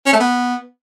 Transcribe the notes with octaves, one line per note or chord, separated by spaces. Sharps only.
C#4
A3
B3